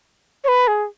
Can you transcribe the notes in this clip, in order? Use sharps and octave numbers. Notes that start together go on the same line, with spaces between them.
C#5
B4
G#4